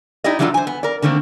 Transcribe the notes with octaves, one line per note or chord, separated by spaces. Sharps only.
D#4 E4 G4 D5 D#5
E3 F#3 G3 D4 F4 A4
C5 G#5
B3
A#4 D5
D3 D#3 A3 A#3 C4